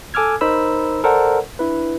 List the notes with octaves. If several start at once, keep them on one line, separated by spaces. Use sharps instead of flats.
A4 G#5 D6 E6 F6 G#6
D#4 A#4 C5 B5 E6
A4 A#4 C5 D5 F#5
D4 E4 B4